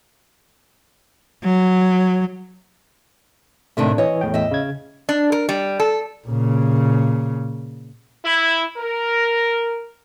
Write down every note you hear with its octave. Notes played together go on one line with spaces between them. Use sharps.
F#3
A2 C3 D#3 A3 D4
E3 C#5 D#5
E2 A2 G5
D#5 E5
C#3 G#6
D4
A#4
G3
A4
A#2 C#3
E4
A#4